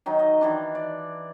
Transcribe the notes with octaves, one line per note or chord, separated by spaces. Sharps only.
D#3 F#3 D#4
D#5
D#3 E3 D4
D5